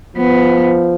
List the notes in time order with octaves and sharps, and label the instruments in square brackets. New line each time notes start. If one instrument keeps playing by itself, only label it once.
[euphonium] F3 [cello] B3